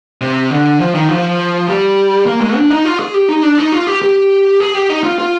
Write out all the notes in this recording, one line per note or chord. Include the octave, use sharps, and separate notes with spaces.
C3
D3
F3
D#3
F3
G3
A#3
G#3
D4
D#4
F4
G#4
G4
D#4
D4
D#4
F4
G4
G4
G#4
G4
D#4
F4
F4